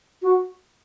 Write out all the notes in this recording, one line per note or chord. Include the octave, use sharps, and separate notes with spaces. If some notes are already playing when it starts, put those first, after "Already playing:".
F#4